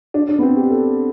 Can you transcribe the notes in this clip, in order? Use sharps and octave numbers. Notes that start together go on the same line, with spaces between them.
D4
D4
B3
C4
G4
A4